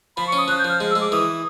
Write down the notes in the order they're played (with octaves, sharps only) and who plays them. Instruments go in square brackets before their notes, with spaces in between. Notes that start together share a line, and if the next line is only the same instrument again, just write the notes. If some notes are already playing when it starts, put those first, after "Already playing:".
[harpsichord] F3 [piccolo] B5
[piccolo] C#6
[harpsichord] C#4
[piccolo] D#6
[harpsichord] F3 [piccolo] F#6
[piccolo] G6
[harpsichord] F3 [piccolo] F6
[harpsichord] G#3
[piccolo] E6
[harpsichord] G#3
[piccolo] D6
[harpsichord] E3 [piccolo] D#6